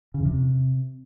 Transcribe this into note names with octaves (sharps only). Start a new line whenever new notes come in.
C#3
E2
C3